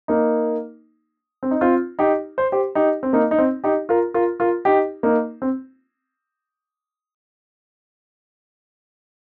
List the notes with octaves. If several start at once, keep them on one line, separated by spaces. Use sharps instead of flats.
A#3 D#4
C4
D#4
C4 F4
D#4 G4
C5
G4 C5
D#4 G4
C4
A#3 D#4
D#4
C4
D#4 G4
F4 A#4
F4 A#4
F4 A#4
D#4 G4
A#3 D#4
C4